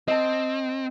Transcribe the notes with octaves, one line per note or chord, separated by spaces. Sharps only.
C4 D#5 A5